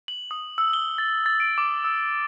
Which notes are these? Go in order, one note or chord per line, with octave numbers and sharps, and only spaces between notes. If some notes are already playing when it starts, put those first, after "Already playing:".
F#7
D#6
E6
G7
A6
A6
D7
D6
E6